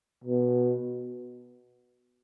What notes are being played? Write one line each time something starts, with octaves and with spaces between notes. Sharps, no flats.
B2